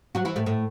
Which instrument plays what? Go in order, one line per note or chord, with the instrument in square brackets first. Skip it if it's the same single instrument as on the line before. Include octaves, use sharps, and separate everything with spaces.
[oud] F#3 F#4
E3 E4
A2 A3
A2 A3